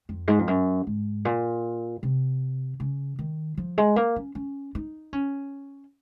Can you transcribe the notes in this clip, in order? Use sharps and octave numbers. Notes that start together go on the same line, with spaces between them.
F2
G#2
F2
F#2
G#2
A#2
C3
C#3
D#3
F3
G#3
A#3
C#4
C#4
D#4
C#4